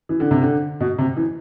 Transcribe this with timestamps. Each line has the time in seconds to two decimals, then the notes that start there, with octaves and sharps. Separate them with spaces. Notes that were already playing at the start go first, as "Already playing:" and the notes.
0.09 E3
0.20 D3
0.31 C3
0.42 D3
0.80 B2
0.98 C3
1.17 E3